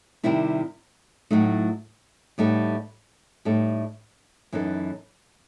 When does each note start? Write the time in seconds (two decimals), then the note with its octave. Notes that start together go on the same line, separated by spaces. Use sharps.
0.23 C3 D#3 G3 C4 E4
1.31 A2 F#3 A3 D#4
2.38 A2 G3 B3 D#4 A4
3.45 A2 G3 D#4 A4
4.52 F#2 E3 B3 D#4 A4